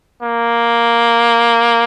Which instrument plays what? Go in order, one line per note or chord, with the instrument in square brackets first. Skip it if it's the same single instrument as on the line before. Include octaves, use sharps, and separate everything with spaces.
[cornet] A#3